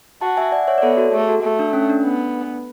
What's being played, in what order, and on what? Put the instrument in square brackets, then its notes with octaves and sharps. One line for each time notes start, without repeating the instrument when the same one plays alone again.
[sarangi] F#4 [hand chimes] F#5 A5
[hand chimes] E5 G#5
D5 F#5
C#5 E5
D5
[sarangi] B3 [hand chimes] A4 C#5
[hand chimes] F#4 A4
[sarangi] A3 [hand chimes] G#4
[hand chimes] F#4
[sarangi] A3
[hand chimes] D4
C#4
D4
[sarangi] B3